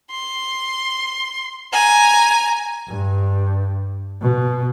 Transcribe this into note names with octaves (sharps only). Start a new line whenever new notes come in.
C6
G#5 A#5
G2
B2